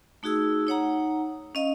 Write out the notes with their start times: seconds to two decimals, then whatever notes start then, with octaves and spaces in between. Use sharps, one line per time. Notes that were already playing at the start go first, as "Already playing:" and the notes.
0.23 A3 D#4 F#4 G#4 E6
0.67 D#4 C#5 F#5 A#5
1.55 C#4 D#5 F5